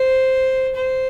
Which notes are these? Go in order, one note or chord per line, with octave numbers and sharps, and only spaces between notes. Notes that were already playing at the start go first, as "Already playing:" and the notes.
Already playing: C5
C5